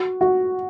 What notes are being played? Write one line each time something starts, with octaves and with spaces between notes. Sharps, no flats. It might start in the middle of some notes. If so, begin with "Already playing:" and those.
Already playing: F#4
F#4